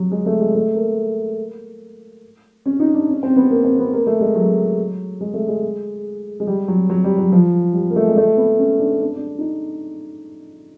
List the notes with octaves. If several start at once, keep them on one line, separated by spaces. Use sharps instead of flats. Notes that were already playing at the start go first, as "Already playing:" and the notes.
Already playing: F#3
G#3
A3
G#3
A3
A#3
C#4
D#4
D4
C#4
C4
B3
A#3
C4
B3
A#3
A3
G#3
F#3
G#3
A3
G#3
G#3
G3
F#3
F#3
G3
F#3
F3
G3
A#3
A3
G#3
A3
B3
C#4
D4
D4
D4
D#4